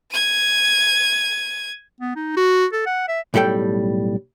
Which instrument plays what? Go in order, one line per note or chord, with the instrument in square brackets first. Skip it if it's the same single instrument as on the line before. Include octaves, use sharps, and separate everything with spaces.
[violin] G#6 D#7
[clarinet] B3
D#4
F#4
A4
F#5
E5
[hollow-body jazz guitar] B1 A2 G3 A4 G5